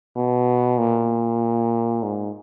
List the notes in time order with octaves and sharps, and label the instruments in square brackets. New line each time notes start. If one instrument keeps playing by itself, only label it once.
[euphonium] B2
A#2
G#2